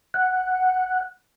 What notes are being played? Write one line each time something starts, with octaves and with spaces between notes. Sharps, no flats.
F#5